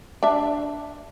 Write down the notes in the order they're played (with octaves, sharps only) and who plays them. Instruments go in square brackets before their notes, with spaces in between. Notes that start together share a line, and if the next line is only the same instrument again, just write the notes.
[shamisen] D4 E5